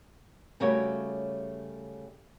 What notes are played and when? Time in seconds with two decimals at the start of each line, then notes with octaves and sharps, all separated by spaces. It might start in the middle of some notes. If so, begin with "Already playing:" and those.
0.60 C#3 G3 A3 F#4 A#4 C#5